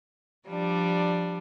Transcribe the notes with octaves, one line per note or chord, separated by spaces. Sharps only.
F3 G3 D4